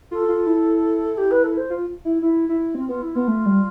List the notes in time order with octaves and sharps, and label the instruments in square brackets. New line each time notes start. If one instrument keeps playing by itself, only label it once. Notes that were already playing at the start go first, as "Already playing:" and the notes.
[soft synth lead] F4 [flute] A4
[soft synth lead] F4
E4
[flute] G4
B4
A4
C5
[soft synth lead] F4
E4
E4
E4
[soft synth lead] C4 [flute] F4
[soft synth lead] B3 [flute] F4
[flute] E4
[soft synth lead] B3 [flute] F4
[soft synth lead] A3
G3